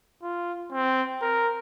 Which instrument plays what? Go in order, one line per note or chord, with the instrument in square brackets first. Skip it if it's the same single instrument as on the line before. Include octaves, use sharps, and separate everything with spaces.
[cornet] F4
C4
A#4